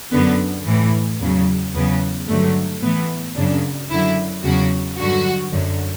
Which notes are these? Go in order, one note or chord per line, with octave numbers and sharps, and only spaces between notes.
F#2 D3 F#3 B3
A2 E3
E2 C#3 F#3
E2 C#3 F#3 B3
G2 D3 F#3 A3
A2 E3 B3
F#2 C#3 F#3 D4
F#2 D3 F#3 E4
E2 C#3 F#3 F#4
G2 D3 F#3 F#4
F#2 D3 F#3